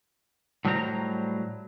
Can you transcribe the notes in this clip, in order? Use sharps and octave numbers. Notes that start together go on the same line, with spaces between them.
A2 F#3 G3 D4 C5 A#5